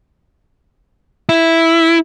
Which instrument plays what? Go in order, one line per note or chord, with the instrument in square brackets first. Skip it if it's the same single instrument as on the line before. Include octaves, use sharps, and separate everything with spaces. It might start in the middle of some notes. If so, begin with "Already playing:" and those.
[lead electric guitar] E4